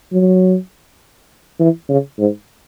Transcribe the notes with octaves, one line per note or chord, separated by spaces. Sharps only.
F#3
E3
C#3
G#2